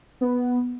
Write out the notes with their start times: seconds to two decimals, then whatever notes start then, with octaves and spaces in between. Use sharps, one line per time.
0.21 B3